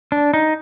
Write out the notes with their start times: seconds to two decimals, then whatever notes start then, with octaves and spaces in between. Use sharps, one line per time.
0.12 D4
0.34 D#4